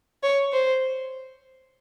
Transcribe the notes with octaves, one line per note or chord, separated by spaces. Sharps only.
C#5
C5